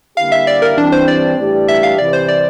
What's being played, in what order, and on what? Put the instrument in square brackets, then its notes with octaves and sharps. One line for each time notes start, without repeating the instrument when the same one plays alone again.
[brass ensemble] D3 G3 A#3 E4 G4 [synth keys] F5
[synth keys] E5
D5
A#4
[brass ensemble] E3 G3 C4 G4 [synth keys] D4
[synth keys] C5
D5
[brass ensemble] A2 E3 G3 D4 G4
[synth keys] E5
F5
[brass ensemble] C2 C3 E3 [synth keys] D5
[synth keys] C5
D5